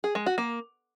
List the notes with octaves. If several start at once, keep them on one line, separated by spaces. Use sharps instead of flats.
G#4
G#3
F#4
A#3